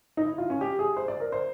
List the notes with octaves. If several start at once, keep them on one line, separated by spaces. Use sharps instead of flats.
D#4
E4
F4
C#4
G4
G#4
C5
D5
A#4
C5